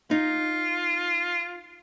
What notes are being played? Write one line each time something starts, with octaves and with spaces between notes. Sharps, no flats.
D#4 F4